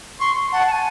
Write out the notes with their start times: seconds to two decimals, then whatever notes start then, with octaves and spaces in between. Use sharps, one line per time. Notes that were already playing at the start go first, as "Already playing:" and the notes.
0.20 C6 C#6
0.52 F#5 A5
0.67 A5
0.72 G#5